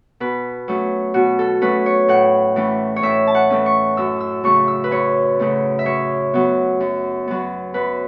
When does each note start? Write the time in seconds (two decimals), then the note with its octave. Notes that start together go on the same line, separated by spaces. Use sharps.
0.20 B2 B4
0.68 F#3 A3 C#4
1.14 B2 F#4
1.39 A4
1.61 F#3 A3 C#4 B4
1.86 C#5
2.08 A2 F#5
2.56 E3 A3 C#4
2.96 C#5
3.03 A2 E5
3.27 A5
3.35 F#5
3.50 E3 A3 C#4
3.66 C#6
3.97 F#2 E6
4.20 E6
4.44 C#3 F#3 A3 C#4 C#6
4.68 E6
4.84 B4
4.91 F#2 C#5
5.39 C#3 F#3 A3 C#4
5.79 E5
5.85 F#2 C#5
6.34 F#3 B3
6.80 F#2
7.28 F#3 B3
7.74 F#2 B4